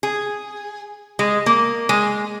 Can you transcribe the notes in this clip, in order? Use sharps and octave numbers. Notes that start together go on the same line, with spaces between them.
G#4
G#3
A#3
G#3